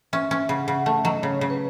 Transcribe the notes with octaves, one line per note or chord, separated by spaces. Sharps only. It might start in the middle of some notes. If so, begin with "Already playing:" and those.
C#4 E5
C#4 E5
C#3 F#5
C#3 F#5
A3 E5
F#3 D#5
C#3 C#5
C#3
B4